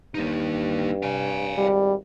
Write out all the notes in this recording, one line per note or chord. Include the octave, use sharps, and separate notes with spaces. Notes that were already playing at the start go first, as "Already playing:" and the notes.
G2 A#3 D#4
F5 G#5
G#1 G3